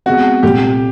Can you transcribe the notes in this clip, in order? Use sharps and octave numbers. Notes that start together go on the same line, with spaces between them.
B2 G#3 C4 F#4
C2 A#2 F3 A3 G4